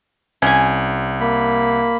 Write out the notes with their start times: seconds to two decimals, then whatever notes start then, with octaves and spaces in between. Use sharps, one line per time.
0.42 C2 C#4 G#5
1.20 A#3 B5